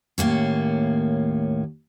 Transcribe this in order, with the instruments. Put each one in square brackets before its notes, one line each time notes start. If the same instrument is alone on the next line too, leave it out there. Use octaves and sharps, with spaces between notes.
[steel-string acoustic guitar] D#2 A2 A#3 C#4